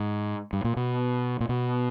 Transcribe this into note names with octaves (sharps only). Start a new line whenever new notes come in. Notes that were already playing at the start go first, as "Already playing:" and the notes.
Already playing: G#2
G2
A#2
B2
A#2
B2